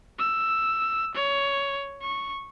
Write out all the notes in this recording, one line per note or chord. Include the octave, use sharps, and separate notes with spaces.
E6
C#5
C#6